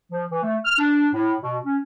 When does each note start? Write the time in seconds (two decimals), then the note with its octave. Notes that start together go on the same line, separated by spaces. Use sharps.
0.12 F3
0.32 E3
0.43 A3
0.65 F6
0.79 D4
1.14 A2
1.43 B2
1.65 C#4